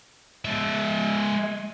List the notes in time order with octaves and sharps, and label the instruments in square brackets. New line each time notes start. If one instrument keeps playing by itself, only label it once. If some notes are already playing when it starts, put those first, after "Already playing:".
[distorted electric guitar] G#3 E5